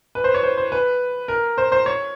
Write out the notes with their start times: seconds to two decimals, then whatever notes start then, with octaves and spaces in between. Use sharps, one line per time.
0.15 B4
0.24 C5
0.34 C#5
0.43 C5
0.57 C5
0.72 B4
1.28 A#4
1.58 C5
1.72 C5
1.86 C#5